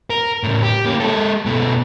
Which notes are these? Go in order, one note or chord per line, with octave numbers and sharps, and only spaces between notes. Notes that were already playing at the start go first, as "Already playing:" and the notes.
A#4
A2 C#3
G4
A#3 C#4
G#3 A4
B2 A3